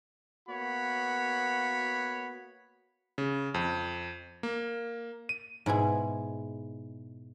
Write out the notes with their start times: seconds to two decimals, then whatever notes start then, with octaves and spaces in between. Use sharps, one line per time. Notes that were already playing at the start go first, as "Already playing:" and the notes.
0.48 A#3 B3 F#4 C#5 B5
3.18 C#3
3.54 F2
4.43 A#3
5.29 D#7
5.66 G#2 B2 E4 G#4